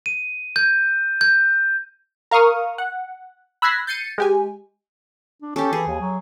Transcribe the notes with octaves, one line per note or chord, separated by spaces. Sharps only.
D#7
G6
G6
A#4 F5 C#6 D#6 F6
F#5
B5 E6 F#6 G#6 A#6 C7
G6 A6 C7 C#7 D#7
G#3 G4 G#5
D4
C#4 G4 A4
E3 G#4
D#2
F#3